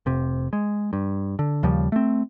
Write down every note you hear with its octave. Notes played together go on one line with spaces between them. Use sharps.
F1 C3
G#3
G2
D3
D#2 C#3 F3 G3
A3 C4